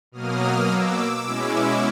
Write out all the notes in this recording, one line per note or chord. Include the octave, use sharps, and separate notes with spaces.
B2 F#3 A#3 D#6 F6
D6 E6
B2 G#3 C#4 E4